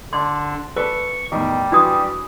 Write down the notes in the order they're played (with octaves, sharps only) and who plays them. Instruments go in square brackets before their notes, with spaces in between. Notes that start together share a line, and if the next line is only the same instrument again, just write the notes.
[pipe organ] D3 D4 [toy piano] C6
[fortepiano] A4 B4 D5 [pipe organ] C#6
[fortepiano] E2 A2 D#3 [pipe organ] G3
[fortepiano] E3 [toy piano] D4 F#4 D#6